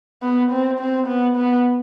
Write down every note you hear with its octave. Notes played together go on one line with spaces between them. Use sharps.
B3
C4
C4
B3
B3